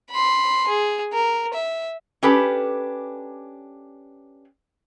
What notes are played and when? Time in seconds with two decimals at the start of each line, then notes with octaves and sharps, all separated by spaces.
0.11 B5 C6
0.68 G#4
1.13 A#4
1.54 E5
2.23 C#4 D4 G4 A4 B4